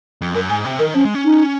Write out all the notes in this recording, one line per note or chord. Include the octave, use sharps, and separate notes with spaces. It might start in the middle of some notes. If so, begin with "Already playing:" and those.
F2
F#2 A#4
G#2 G#5
C3
D#3 A#4
F3 C#4
G#3
C#4
D#4